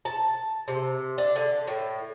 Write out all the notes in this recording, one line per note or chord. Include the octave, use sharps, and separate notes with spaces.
A5
C3
D4
D3
A2